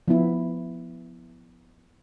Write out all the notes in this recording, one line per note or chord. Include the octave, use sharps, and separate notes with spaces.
F3 B3 E4